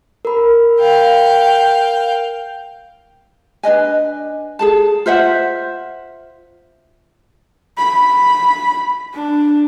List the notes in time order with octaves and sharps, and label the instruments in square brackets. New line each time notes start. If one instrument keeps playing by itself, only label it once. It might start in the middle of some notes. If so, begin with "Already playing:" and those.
[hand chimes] A#4 B5
[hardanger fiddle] F5 G5
[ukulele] D4 B4 D#5 G#5
G#4 A4 A5
F4 C5 E5 F#5
[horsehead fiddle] B5
D4